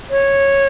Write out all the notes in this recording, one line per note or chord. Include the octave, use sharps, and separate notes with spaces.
C#5